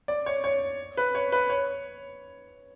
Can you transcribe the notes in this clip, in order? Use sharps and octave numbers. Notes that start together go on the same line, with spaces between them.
D5
C#5
C#5
B4
C#5
B4
C#5